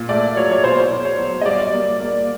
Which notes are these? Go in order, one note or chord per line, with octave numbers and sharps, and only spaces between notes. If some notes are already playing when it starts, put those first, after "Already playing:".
Already playing: A#2
A3 D5
F#3 C#5
C#5
B2 C5
B2
C#5
F#3
D#5
G3 D5
A#3
A#3